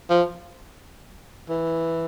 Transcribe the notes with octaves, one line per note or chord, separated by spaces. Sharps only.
F3
E3